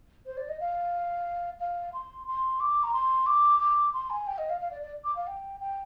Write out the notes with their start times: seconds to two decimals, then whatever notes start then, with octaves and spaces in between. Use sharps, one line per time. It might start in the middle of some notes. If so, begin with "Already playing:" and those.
0.26 C5
0.37 D5
0.49 D#5
0.60 F5
1.60 F5
1.93 C6
2.27 C6
2.60 D6
2.83 A#5
2.93 C6
3.26 D6
3.59 D6
3.93 C6
4.10 G#5
4.27 G5
4.38 D#5
4.49 F5
4.60 F5
4.71 D5
4.82 D5
5.04 D6
5.16 F5
5.27 G5
5.60 G5